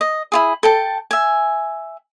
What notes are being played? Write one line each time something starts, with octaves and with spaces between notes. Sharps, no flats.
D#5
E4 F4 G#4
A4 G5 A5
E5 G#5